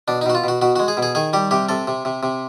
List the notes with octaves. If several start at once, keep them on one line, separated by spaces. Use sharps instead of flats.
B2 D4
D#4
B2 F#4
F4
B2 F#4
B2 F#4
G#3 F#4
G#4
B2
G#4
D#3 G#4
G3 G4
C3 G4
C3 A4
C3
C3
C3